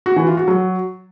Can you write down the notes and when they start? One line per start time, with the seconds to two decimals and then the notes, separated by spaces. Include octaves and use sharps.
0.06 F#4
0.16 E3
0.27 F4
0.37 F#4
0.48 F#3